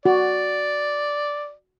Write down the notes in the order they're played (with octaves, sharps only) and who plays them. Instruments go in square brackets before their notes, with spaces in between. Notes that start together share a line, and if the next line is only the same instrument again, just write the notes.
[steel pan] F#4 [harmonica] D5